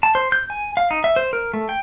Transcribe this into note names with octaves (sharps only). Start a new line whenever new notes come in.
A5
C5
G6
G#5
F5
D#4
E5
C5
A#4
A3
G5